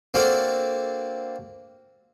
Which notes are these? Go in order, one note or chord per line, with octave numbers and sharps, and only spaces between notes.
A#3 C4 D4 F#4 A4